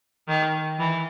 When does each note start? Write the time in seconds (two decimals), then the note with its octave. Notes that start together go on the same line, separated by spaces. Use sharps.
0.28 D#3
0.79 E3